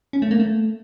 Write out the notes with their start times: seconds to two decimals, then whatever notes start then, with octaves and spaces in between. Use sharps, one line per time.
0.13 C#4
0.22 A3
0.31 A#3
0.40 A3